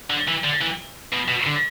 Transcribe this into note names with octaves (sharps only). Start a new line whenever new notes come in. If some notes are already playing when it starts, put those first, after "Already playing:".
D3
E3
D3
E3
B2
B2
D3